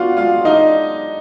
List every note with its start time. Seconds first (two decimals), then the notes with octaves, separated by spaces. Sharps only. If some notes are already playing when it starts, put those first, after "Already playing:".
Already playing: B3 D4 F4 F#4 F5
0.17 G#3 F4 F5
0.45 D4 D#4 D#5